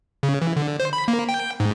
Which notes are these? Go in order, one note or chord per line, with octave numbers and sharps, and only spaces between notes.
C#3
E3
D3
C5
B5
A#3
G5
G#2